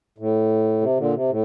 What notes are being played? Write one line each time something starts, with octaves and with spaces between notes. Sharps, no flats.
A2
C3
A#2 D3
C3
A2